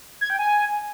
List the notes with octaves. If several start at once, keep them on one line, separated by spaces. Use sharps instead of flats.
G#6
G5
G#5